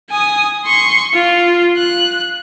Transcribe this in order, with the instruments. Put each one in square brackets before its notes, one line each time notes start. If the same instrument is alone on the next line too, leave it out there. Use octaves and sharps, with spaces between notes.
[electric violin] G#5 D#6
C6 C#6
F4
F#6